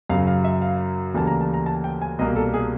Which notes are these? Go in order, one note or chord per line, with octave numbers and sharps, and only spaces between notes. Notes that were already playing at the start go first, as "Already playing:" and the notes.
F#2 C#3 F#3 F5
F5
E5
F5
D2 C#3 E3 G3 A#3 A5
A#5
A5
A#5
A5
G5
G#5
C2 B2 G3 A#3 D#5
A4
G#4